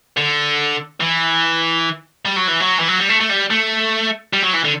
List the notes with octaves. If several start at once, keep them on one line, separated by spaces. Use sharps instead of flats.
D3
E3
G3
F#3
E3
F#3
E3
F#3
G3
A3
A3
G3
A3
G3
F#3
E3
D3